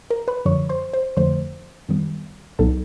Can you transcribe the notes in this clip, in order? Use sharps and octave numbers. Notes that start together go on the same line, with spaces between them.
A#4 A#5
B4 B5
F#2 D3 F3 C#5 C#6
C5 C6
C5 C6
F2 D3 F3 A3 C5 C6
F#2 D#3 G3 B3
C2 A#2 F#3 B3 D#4 A4 A5